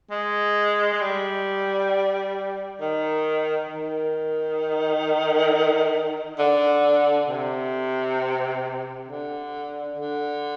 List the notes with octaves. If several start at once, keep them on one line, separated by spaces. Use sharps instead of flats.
G#3
G#3
G3
D#3
D#3
D3
C3
D3
D3